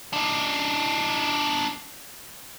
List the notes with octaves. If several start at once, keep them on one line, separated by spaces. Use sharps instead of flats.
D4 D#4